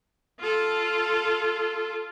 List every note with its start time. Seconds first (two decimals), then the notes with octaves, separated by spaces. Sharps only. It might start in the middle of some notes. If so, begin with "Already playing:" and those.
0.40 F4 A4